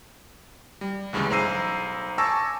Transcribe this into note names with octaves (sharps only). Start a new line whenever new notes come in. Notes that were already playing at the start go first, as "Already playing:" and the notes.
G3
D2 G2 C#3 E3 G#3
B1 C5 A#5 E6 C7 D#7
G#5 A5 C#6 D6 E6 A#6